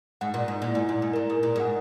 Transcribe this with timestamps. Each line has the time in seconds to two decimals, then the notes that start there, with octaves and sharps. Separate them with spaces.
0.21 G#2 F#5
0.34 A#2
0.48 G#2
0.62 A#2
0.68 E4
0.75 G#2
0.89 A#2
1.02 G#2
1.13 A#2 A#4
1.30 G#2
1.43 A#2
1.56 G#2 F#5